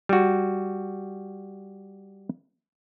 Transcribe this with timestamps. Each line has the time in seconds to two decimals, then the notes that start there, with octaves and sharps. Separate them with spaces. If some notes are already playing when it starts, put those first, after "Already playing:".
0.09 G3 F#4